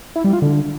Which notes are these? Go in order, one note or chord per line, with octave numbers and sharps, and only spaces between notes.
E4
G3
F4
D3